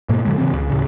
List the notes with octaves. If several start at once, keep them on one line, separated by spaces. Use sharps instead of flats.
G#2 B2 A#3
A#2 D3 F#3 G#3
C#3 E3 C4
C#2
D2 A2 C#3